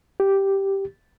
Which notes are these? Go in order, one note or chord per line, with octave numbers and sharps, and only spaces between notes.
G4